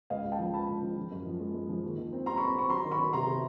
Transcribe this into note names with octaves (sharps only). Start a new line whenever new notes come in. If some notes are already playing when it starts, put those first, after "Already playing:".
C#2 D#5 F5
C#2
G5 A5
F3
C#2 A5 B5
C#2
F3
F3
F#2
F3
G#3
G#3
F3
D#2
D#3
C4
G3 A#5 C6
B5 C#6
C4
C4 B5 C#6
F#3 A#5 C6
D#3
B5 C#6
F#3
C3 A#5 C6
C3